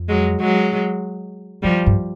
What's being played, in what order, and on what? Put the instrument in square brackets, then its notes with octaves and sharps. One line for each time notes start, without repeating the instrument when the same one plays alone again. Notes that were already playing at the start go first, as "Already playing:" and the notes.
Already playing: [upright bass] F2
[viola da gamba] F#3 G#3
F#3 G#3
[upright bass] F#2 [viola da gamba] F3 G3
[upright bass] G2